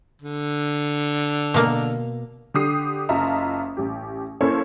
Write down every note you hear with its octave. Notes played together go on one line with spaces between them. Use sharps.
D3
B2 A#3
D3 G4 D#6 C7
F#1 F4 D#5 E5 A5 A#5
A1 G4
A#3 C#4 E4 A4 C5 C#5